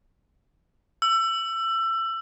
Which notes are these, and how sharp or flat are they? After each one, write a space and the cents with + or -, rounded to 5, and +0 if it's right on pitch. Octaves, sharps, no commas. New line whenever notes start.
E6 +25